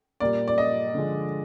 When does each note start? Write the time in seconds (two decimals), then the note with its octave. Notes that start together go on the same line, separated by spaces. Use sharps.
0.20 A#2 G3 A#3 D5
0.48 D5
0.58 D#5
0.94 D3 F3 G#3